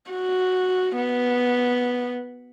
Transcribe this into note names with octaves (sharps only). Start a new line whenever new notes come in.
F#4
B3